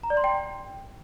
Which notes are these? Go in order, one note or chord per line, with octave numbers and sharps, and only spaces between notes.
A#5
D5
C6
G5